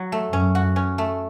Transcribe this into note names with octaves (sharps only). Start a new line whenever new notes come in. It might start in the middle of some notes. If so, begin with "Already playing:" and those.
Already playing: F#3
A3
F#2 C#4
F#4
C#4
A3